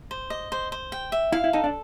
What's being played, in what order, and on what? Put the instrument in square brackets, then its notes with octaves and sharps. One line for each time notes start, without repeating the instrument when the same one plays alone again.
[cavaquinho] C5
D#5
C5
C5
G5
E5
[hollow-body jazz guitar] E4 [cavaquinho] F5
[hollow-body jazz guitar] E4
[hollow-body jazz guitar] D#4 [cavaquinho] A4
[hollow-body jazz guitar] D4